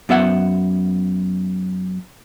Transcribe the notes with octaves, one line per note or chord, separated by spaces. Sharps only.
F#2 B3 E5 F#5